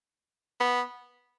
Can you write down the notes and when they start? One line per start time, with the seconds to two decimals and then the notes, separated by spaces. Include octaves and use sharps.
0.60 B3